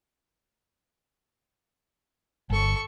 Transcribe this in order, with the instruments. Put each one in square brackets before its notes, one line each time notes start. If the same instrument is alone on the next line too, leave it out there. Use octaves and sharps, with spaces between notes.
[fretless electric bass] G1 [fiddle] A4 C#6